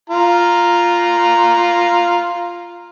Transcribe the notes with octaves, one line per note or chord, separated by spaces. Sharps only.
F4 A#5